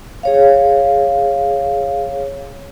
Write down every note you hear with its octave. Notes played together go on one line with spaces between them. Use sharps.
G#4 C#5 F5